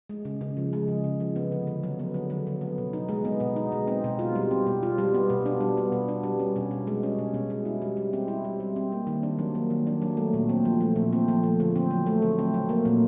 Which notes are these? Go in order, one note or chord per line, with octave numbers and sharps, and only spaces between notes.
G#3
C#3
C#3
F3
G#3
C#3
C#3
F3
B3
D3
D3
F#3
B3
D3
D3
F#3
B3
B2
D#4
G#3
B3
B2
D#4
G#3
C4
B2
F4
G3
C4
B2
F4
G3
B3
B2
D4
G3
B3
B2
D4
G3
C#4
B2
B2
G#3
C#4
B2
B2
G#3
E4
G3
G3
C4
E4
G3
G3
C4
A#3
D#3
D4
F#3
A#3
D#3
D4
F#3
A3
A#2
C4
F3
A3
A#2
C4
F3
A3
D3
C4
F#3
A3
D3
C4
F#3
A#3
A#2